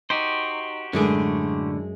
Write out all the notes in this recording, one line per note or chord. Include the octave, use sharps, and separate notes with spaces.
D#4 F#4 G4 C5
F#2 A2 D3 G#3 G#4